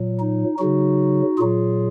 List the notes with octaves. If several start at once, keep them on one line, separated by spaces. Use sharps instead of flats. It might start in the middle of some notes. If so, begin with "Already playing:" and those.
Already playing: A#2 F#3
D#4
C#3 F#3 D#4 F#4
A#2 F#3 F4 G#4